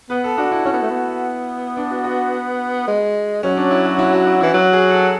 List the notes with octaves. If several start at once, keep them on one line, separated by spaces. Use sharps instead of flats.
B3 B4
A4
D4 F#4
E4
C#4 E4
B3
A3
B3
D4
F#4
F#4
G#3
F#3 C#4
D4
E4
F#4
E4
F#4
E4
E3 E4
F#3 F#4
G#4
A4